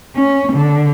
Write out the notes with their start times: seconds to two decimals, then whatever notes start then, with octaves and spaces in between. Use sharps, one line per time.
0.15 C#4
0.52 D3